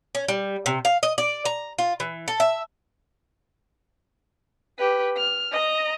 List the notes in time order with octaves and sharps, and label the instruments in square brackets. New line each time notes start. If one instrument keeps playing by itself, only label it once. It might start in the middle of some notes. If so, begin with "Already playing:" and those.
[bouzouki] C#4
G3
C3
F5
D#5
D5
A#5
F4
E3
A4
E5
[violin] G4 B4
F6
D#5 A#5